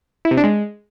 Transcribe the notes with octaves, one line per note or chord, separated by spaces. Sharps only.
E4
C3
D4
G#3